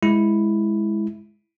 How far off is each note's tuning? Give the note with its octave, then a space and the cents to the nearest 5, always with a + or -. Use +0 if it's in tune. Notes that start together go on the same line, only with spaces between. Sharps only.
G#3 +0 E4 +0